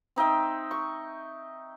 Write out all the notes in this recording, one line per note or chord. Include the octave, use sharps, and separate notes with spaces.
C4 D#4 E5 G5
C#6